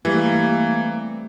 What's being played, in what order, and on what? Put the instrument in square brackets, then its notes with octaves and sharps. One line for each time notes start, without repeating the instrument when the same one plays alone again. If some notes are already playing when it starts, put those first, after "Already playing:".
[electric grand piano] E3 [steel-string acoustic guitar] G3 A3 C4 [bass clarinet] A#3